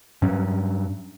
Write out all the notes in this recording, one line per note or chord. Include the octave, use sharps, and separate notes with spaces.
G2 F#3 C#4